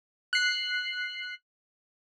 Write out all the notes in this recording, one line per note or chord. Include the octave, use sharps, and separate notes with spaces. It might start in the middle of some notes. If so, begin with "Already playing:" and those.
F#6 C7